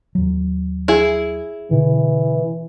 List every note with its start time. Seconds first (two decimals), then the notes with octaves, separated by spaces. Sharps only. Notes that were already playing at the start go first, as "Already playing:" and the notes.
0.15 D#2 F#3
0.88 E4 G#4
1.71 B2 D3 E3